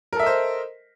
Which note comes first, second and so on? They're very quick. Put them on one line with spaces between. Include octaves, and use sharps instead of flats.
A#4 A4 E5 D#5 C5